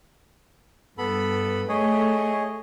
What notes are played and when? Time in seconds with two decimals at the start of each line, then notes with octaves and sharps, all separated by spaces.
0.98 G2 B3 A4 B5
1.69 A3 G#4 C#5 D#5